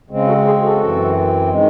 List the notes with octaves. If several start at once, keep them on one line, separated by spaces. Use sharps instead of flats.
C#3 G#3 C4
F#4 A4
G#4 C5
F#4 A4
F#2 E3 C4
D#3 G#3